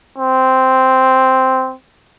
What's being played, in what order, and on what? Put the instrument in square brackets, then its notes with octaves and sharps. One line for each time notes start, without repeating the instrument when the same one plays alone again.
[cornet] C4